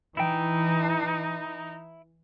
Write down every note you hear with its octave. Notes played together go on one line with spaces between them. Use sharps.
E3 D#4 E4 G5